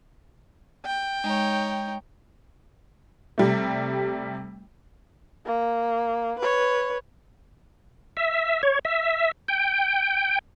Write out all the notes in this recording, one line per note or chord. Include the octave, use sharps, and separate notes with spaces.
G5
G#3 D#4 C#5
C3 G3 A3
A#3
B4 C#5
E5
C#5
E5
G5